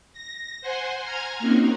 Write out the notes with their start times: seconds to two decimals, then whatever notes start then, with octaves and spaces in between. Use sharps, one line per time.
0.13 A#6
0.61 C5 F#5 G#5 C6
1.02 G#5 A#5 F6 G#6
1.39 A#3 C4 C#4 D#4 F#4